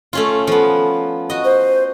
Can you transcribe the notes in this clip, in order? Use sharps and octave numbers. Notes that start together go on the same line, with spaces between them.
A3 C#4 F4
F3 B3
F#4 D#5
C5